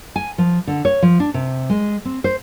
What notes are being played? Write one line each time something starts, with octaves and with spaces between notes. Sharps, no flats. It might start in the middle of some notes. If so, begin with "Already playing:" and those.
G#5
F3
D3
C#5
F3
D4
C3
G#3
C4
C5